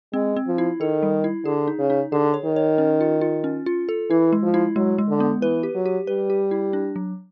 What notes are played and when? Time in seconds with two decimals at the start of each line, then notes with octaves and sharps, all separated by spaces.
0.14 G#3 C4
0.36 C4
0.47 F3
0.58 E4
0.80 D#3 A4
1.03 G3
1.24 E4
1.45 D3 G#4
1.68 D#4
1.79 C#3
1.90 D#4
2.12 D3 G#4
2.34 C#5
2.45 D#3
2.56 C#5
2.78 C#4
3.01 F4
3.21 F4
3.44 C#4
3.66 F4
3.89 A4
4.10 E3 E4
4.33 G#3
4.43 F3
4.54 E4
4.76 F#3 G#3
4.98 G#3
5.09 D3
5.20 B3
5.42 E3 B4
5.63 G4
5.75 F#3
5.86 G4
6.07 G3 B4
6.30 G4
6.51 E4
6.73 D4
6.96 F#3